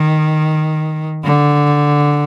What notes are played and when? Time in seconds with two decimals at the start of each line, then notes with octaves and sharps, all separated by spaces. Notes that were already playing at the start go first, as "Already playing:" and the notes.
Already playing: D#3
1.24 D3